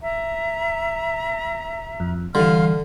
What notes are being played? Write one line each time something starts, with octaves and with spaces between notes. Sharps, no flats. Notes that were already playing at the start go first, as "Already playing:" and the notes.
E5 A#5
F2
D3 E3 G3 F5 C6 F6